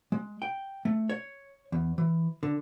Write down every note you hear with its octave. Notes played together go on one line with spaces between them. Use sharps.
G#3
G5
A3
C#5
E2
E3
D3